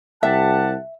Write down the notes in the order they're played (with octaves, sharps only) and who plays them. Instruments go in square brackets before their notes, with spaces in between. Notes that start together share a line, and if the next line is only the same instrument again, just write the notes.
[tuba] C2 [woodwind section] G4 F#5 A5 [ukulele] E5